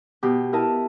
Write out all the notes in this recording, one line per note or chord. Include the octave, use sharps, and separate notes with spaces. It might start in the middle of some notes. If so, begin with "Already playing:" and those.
B2 G4
E4 A#4 D#5 A5